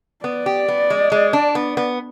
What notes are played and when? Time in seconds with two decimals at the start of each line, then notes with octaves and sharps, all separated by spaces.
0.24 B3 D5
0.46 G4
0.68 B3
0.90 G#3
1.12 G#3
1.33 D4
1.55 B3
1.77 B3